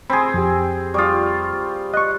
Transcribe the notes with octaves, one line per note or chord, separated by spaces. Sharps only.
C4 G#4 B5 C6
F2 G4
G3 F4 C#6 D#6
D#5 C#6 F#6